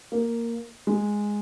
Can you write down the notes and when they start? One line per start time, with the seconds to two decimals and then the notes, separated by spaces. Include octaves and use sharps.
0.12 A#3
0.87 G#3